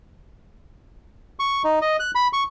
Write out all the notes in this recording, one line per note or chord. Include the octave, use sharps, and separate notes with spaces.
C#6
D#4
D#5
F#6
B5
C#6